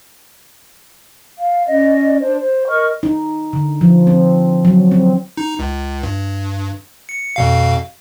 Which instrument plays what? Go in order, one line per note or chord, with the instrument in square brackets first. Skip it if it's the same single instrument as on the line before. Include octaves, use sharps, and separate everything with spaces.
[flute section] F5
C#4 D5 D#5
D4 C5
C5
A#4 D#5 C#6 F6
[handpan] D#4
D3
F3
C4
F#3
C4
[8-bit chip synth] D#4
C#2
G2
C#7
F2 B2 F5